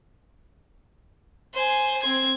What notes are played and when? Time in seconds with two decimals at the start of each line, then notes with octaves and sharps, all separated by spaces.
1.54 C5 G#5
2.02 C4 G#6